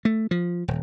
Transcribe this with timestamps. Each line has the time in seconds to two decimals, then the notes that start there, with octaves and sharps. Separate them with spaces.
0.05 A3
0.31 F3
0.68 D#1